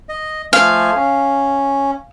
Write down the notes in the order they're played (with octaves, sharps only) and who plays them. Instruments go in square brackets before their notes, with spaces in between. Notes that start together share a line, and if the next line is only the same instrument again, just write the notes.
[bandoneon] D#5
[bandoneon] F3 A3 G#5 [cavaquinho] F5
[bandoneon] C#4